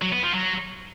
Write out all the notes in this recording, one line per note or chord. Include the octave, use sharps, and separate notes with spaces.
F#3
B3
F3
F#3